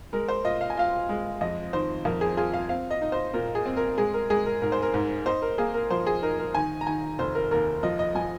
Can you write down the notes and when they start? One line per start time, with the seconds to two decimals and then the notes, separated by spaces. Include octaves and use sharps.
0.13 G#3 A#4
0.28 C5
0.45 F4 D#5
0.61 F5
0.70 G#5
0.77 F4 F5
1.09 G#3
1.41 F2 D#5
1.73 D#3 C5
2.05 F2 A#4
2.21 G#4
2.37 F4 G#4
2.53 F5
2.69 C4 F5
2.91 D#5
3.02 D#4
3.12 C5
3.34 A#2 A#4
3.55 G#4
3.66 C4
3.77 A#4
3.98 G#3 G#4
4.14 A#4
4.30 G#3 G#4
4.46 A#4
4.62 G#2 A#4
4.72 C5
4.82 A#4
4.94 G#2
5.26 D#4 C5
5.42 A#4
5.58 A#3 G#4
5.74 A#4
5.90 F3 C5
6.07 G#4
6.22 D#4 A#4
6.39 A#4
6.55 D#3 G#5
6.81 A#5
6.87 D#3 G#5
7.19 F1 C5
7.35 A#4
7.51 D#2 A#4
7.83 F3 D#5
7.99 D#5
8.15 F3 G#5